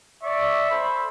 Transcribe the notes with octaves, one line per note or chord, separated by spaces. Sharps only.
D5 E5 C#6
A4 C5 B5